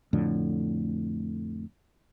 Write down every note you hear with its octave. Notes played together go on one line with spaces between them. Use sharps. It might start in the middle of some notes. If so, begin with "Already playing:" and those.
F2 A2 D3